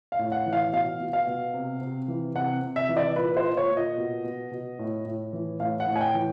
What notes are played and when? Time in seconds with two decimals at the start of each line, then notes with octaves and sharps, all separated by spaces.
0.12 F5
0.19 A2
0.32 F#5
0.46 E3
0.53 F5
0.73 B2 F5
1.00 B2
1.13 F5
1.27 B2
1.54 C3
1.81 C3
2.08 E3
2.35 C3 F#5
2.62 C3
2.76 E5
2.89 E3
2.97 D5
3.16 A#2 B4
3.37 C5
3.44 A#2
3.57 C#5
3.71 A#2
3.77 D#5
3.97 B2
4.24 B2
4.51 B2
4.79 A2
5.05 A2
5.33 E3
5.60 A2 F5
5.80 F#5
5.87 A2
5.96 G#5
6.01 G5
6.14 E3